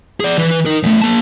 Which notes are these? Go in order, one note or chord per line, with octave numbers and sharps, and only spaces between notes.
G#4 D5
E3 B4
D#4 A#4
E2 A3
A#3 A5